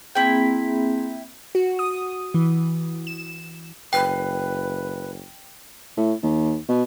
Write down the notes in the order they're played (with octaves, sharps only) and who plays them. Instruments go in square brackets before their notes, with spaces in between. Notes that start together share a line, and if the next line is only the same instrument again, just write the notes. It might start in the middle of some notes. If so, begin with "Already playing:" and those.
[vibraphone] A#3 C4 G#4 [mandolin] E4 G5
[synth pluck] F#4
D#6
E3
E7
[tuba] F#1 [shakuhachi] B4 [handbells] G5
[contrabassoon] A2
D#2
B2